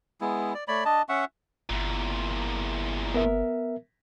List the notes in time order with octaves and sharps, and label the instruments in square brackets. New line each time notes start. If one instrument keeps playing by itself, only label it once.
[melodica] G#3 B3 E4
D5
A3 C#5 D5 B5
D4 D#5 A5
C#4 E5 F#5 C#6
[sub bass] G1 [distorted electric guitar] E2 A#2
[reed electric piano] B3 A#4 E5